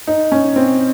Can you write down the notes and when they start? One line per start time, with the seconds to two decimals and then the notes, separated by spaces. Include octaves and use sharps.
0.07 D#4
0.32 C#4
0.56 C4